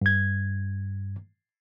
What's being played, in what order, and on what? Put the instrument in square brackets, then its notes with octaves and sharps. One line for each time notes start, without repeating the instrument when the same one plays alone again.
[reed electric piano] G2 G#6